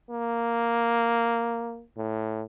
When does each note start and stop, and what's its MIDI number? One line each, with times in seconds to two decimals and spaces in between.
0.10 1.83 58
1.97 2.43 45